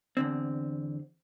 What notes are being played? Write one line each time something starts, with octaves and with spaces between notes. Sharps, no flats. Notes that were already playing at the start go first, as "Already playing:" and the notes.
E2 D3 C4